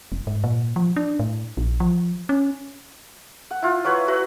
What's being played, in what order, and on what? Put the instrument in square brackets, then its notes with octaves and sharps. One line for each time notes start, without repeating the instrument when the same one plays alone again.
[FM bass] F1
G#2
A#2
F3
D4
A2
A#1
F3
C#4
[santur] F#5
E4 F4
F#3 F#4 B4 C#5
F#4 B4 E5